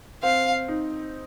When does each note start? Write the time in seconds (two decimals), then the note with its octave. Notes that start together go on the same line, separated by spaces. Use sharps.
0.23 C4 F5
0.68 D#4